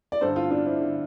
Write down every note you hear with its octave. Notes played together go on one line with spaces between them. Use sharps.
D5
G2 D3 A4 C5
F4 A4
D4 F4
C4 E4
D3